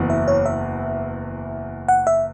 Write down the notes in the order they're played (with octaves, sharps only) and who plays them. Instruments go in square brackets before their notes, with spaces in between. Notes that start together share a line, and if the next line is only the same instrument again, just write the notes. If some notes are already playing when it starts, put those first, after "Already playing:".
Already playing: [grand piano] F#1 E2 E3
[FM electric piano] E5
C#5
E5
F#5
E5